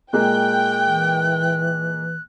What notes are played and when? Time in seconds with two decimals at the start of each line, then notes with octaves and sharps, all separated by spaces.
0.13 A#2 G#3 A#3 G5 F#6
0.86 E3